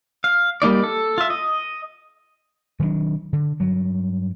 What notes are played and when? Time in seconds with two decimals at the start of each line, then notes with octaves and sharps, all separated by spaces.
0.24 F5
0.62 G3 A#3 D#4 D5
0.84 A4
1.18 F4 E5
1.30 D#5
2.80 D#3 F#3 G#3 D4
3.33 D3
3.60 G2 F#3